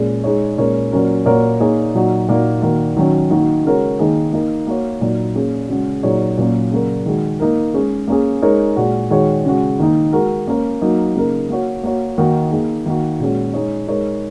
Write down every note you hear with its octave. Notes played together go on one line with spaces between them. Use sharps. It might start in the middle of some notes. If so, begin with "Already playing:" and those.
Already playing: A#2 G#3 C#4 G#4
G#3 D#4 G#4 C#5
A#2 G#3 C#4 A#4 C#5
A#2 F#3 C#4 A#4
A#2 A#3 F#4 A#4 C#5
A#3 D#4 G#4 C#5
A#2 F#3 D#4 F#4
A#2 A#3 D#4 F#4 A#4
D#3 A#3 F#4 A#4
D#3 F#3 C#4
D#3 A#3 D#4 F#4
C#3 G#3 F#4 A#4 C#5
D#3 A#3 D#4 G#4
A#3 D#4 A#4
A#3 F#4 C#5
A#2 F#3 A#3 D#4
A#3 C#4 G#4
C#3 G#3 C#4 F#4
A#2 F#3 D#4 G#4 C#5
A#2 F#3 A#3 C#4 F#4
C#3 F#3 A#3 F#4 A#4
D#3 G#3 F#4
A#3 D#4 A#4
G#3 C#4 G#4 C#5
A#3 C#4 G#4
G#3 D#4 A#4 C#5
A#2 G#3 F#4
D#3 G#3 F#4 C#5
C#3 G#3 F#4
D#3 A#3 D#4
G#3 F#4 A#4
A#3 C#4 A#4 C#5
F#3 A#3 D#4 A#4
C#3 A#3 D#4 A#4
A#3 F#4 C#5
A#3 F#4 C#5
D#3 A#3 D#4 F#4 A#4
A#3 D#4 G#4
D#3 A#3 D#4 F#4
A#2 G#3 C#4 F#4
G#3 D#4 G#4 C#5
G#3 D#4 A#4 C#5